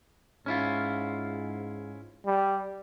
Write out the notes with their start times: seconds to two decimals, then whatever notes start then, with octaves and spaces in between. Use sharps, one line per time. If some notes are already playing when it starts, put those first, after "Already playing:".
0.46 G#2 C#4 E4 F4
2.26 G3